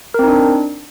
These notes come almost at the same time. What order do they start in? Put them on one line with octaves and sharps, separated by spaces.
A#4 C4 D#4 D4